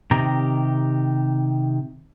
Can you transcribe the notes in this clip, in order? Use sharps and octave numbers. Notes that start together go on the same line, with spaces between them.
C3 D#3 G4 A#5